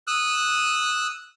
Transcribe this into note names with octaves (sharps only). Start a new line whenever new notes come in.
D#6 E6 F#6